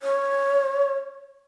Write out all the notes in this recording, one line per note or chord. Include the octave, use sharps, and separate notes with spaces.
C#5